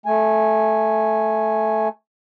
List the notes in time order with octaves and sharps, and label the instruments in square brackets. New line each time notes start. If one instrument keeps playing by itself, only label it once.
[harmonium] A3 G#5